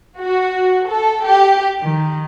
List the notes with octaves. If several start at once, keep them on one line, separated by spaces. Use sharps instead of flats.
F#4
A4
G4
D#3